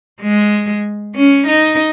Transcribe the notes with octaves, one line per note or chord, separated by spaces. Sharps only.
G#3
C#4
D#4